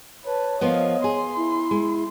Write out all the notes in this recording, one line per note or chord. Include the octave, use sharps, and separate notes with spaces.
B4 C#5 A5
F3 A#3 B3 D#5 F5
G#4 C6
E4
G#3